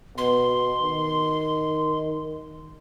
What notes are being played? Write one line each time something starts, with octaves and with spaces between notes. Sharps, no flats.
B2 C6
D#3